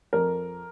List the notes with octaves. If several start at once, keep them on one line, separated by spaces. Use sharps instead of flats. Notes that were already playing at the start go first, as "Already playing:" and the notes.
F2 A#4